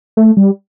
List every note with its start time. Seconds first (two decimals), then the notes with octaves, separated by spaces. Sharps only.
0.17 A3
0.37 G3